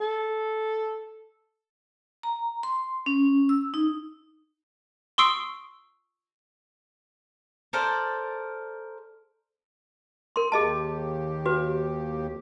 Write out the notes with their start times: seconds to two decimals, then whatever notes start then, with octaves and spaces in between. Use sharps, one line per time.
0.01 A4
2.23 A#5
2.63 C6
3.06 C#4
3.49 E6
3.74 D#4
5.18 C6 C#6 D#6 E6 C7 D7
7.73 A4 A#4 C5 D5
10.36 A#4 C6
10.52 D#2 G4 G#4 D#5 A5
11.46 F#4 B4
12.27 F2